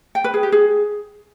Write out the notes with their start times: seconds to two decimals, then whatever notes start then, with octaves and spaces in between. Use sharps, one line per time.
0.15 G5
0.24 B4
0.34 G#4
0.43 G4
0.52 G#4